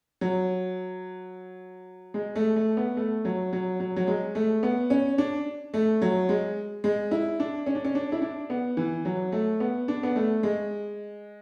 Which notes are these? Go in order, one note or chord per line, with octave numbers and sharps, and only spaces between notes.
F#3
G#3
A3
A3
B3
A3
F#3
F#3
F#3
F#3
G#3
A3
B3
C#4
D4
A3
F#3
G#3
G#3
E4
D4
C#4
D4
C#4
D4
E4
D4
B3
E3
F#3
A3
B3
D4
B3
A3
G#3